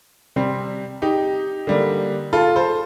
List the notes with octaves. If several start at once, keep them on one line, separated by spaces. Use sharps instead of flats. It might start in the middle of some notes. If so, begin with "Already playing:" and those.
C3 G3 C4
D#4 G4
D3 G3 A#3
F4 A4
A4 C5